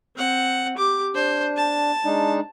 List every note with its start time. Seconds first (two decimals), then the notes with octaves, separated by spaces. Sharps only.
0.16 C4 F#5
0.77 G4 D6
1.15 D4 C5
1.57 A5
2.05 G#3 D4 D#4